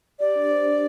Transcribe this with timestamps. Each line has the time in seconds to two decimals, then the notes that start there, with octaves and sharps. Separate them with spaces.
0.20 G4 D5
0.35 D4
0.51 C5
0.66 D4